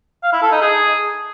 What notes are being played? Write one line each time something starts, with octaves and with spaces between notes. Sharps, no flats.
F5
E4
A4
D#4
G#4